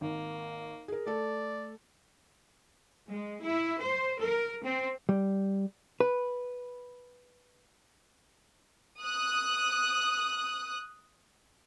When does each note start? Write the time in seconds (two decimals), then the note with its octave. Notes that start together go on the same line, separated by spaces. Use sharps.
0.01 G#1 A#3
0.88 G#4 A#4
1.06 A3 A4 D5
3.09 G#3
3.43 E4
3.82 C5
4.22 A#4
4.64 C4
5.09 G3
6.00 B4
9.02 D#6 F#6